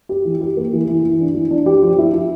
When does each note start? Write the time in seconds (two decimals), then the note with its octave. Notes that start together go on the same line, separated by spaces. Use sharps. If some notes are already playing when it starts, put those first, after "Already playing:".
0.09 G4
0.25 E3
0.41 G4
0.57 A#3
0.73 E3
0.88 E3
1.03 E3
1.20 D4
1.35 E3
1.51 D4
1.66 G4
1.82 F3
1.98 E4
2.13 E4